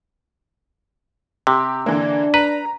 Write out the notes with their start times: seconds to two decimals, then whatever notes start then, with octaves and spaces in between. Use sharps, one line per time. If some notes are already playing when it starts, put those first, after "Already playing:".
1.47 C3 G4
1.86 D3 E3 A#3 D4
2.34 B4 A#5